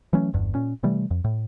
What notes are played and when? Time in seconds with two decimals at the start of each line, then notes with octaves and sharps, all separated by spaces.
0.13 E3 F#3 A3 C#4
0.33 G1 E2 G2
0.55 A#2 C#4
0.83 C3 E3 G3 A3
1.11 F2
1.24 A2